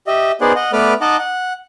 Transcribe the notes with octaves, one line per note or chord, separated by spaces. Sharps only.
G4 D#5 E5
B3 D#4 G#4 C5 D5 F#5
D#5 F#5
A3 B3 B4 D5 D6 F6
D#4 D#5 F#5 A5 D6
F#5